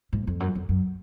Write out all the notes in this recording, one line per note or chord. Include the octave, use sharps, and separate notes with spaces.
G#2
F2
F#2
F2
F#2